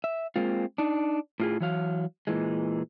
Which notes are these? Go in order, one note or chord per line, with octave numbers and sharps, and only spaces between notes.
E5
G#3 A#3 C4 F4
D4 D#4
A2 F4 G#4
E3 F#3 F5
A#2 E3 G#3